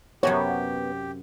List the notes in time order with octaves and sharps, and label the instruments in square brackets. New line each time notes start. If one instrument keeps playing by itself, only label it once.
[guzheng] F#2 C3 F#4 [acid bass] B3 [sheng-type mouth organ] G4 [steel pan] C#5